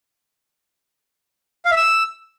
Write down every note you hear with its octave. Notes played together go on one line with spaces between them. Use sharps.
F5
E5
E6